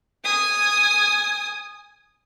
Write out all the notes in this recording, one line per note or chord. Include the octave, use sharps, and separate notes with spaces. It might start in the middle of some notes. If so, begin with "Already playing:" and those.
G#5 D#6